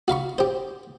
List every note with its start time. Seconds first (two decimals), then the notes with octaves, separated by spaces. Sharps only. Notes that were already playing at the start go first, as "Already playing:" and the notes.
0.08 F#4 F5 B5 C#6
0.38 G4 C5